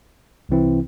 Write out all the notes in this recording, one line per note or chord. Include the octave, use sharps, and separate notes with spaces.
C2 C3 E3 C4 E4